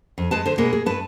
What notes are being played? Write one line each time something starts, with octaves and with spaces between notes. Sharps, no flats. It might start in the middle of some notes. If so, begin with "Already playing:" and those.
F2
G#3 B4 A5
D3 C5
B2 G#3 A#3
G#4
G2 B4 A5